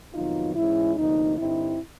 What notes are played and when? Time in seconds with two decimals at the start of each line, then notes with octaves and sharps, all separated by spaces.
0.14 F2 C3 D#3 F#3 B3 D#4 F4
0.55 G#2 E3 G#3 C#4 E4
0.96 D2 C3 F3 A#3 D4 D#4
1.37 G2 D3 G3 C4 D#4 E4